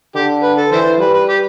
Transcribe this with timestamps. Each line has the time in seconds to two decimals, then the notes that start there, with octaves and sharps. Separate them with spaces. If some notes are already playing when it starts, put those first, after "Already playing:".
0.15 D3 G4
0.43 B4
0.58 A4
0.72 E3 E4 A4 C5
1.00 G3 B4
1.14 B4
1.29 G4